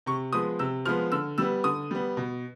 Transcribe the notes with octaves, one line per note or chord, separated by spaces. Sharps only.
C3 C#6
F3 G#3 B3 D#6
C3 E6
F3 G#3 B3 F6
D3 E6
G3 B3 E6
D3 D#6
G3 B3
B2